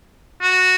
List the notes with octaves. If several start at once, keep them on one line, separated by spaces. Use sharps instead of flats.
F#4